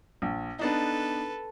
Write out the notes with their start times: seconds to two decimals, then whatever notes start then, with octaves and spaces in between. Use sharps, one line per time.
0.22 A#1
0.59 B3 D4 D#4 A4 B4